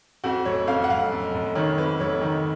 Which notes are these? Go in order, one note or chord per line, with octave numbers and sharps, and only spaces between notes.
F2 F#4
F1 C#5
F2 F5
F#5
F1 F5
F1
F1
D#3 C#5
F2 B4
F1 C#5
D#3